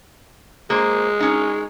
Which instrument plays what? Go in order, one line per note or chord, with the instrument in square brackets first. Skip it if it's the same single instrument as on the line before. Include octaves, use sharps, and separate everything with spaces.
[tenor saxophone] G#3 [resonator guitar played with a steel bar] A#3 C5
[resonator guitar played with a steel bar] C#4 D#4